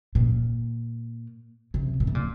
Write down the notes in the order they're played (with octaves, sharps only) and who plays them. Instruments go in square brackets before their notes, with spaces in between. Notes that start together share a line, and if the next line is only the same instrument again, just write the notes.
[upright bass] A#2
C3
A#2
C3
A#2